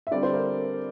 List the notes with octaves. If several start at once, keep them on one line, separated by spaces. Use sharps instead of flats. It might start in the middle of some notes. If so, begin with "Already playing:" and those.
E5
D3 G3 C4 D5
C5
A#4